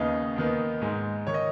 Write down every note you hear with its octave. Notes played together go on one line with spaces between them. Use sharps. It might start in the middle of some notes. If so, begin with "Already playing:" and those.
Already playing: D#2 C#3 B3 D#4 D#5
D#2 D#3 B3 D#4
G#2 G#3 D#4
D#3 C#5
D#5